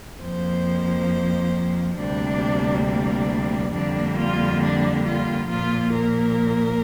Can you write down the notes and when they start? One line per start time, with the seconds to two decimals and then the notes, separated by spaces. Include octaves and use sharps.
0.20 F2 F3 A#3 C5
1.96 D2 C3 G3 A#3 D4
2.85 D4
3.73 F2 D3 G3 A#3 D4
4.17 F4
4.61 D4
5.05 F4
5.49 A#2 F3 A#3 F4
5.93 A#4